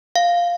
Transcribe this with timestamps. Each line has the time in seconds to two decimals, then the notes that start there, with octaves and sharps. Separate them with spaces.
0.16 F5